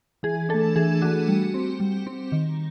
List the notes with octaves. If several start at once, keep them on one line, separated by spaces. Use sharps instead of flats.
E3 G#4
A3 D4 A4
E3 G#4
A3 D4 F#4
G3
C4
G3
C4
D#3